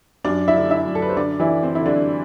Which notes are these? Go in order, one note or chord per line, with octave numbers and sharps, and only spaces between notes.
F#2 D4 D5
E4 E5
D3
E4 E5
F#2
A4
B4
C5
D3 D4 D5
E3 E4
D3
C4
D3 E4
D3 D4